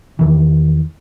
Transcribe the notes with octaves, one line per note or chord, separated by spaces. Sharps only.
E2 D#3 E3